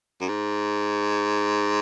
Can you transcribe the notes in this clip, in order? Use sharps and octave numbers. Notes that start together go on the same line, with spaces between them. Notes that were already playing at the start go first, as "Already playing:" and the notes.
F#2
G#2